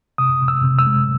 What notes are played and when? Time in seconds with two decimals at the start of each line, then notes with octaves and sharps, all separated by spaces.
0.18 C3 D#6
0.41 C3
0.48 E6
0.63 C3
0.79 E6
0.87 G#3